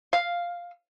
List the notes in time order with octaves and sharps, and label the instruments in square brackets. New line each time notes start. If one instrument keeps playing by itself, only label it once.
[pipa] F5